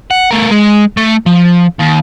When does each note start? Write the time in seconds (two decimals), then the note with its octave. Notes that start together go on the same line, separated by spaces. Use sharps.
0.11 F#5
0.31 A3 A#4
0.51 G#3
0.97 A3
1.26 F3
1.80 D#2